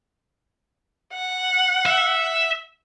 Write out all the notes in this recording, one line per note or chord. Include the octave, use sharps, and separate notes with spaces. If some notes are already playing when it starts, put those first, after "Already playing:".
F#5
E5